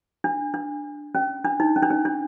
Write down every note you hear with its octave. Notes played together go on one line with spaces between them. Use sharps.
D4
D4
C#4
D4
D#4
C#4
D4
C#4
D4